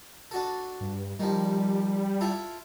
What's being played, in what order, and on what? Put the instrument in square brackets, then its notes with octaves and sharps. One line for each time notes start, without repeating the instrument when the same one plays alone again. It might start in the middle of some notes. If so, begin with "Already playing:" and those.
[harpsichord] D4 F#4 A4
[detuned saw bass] G2
[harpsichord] D#3 F3 [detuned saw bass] G3
[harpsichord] E4 F4 A4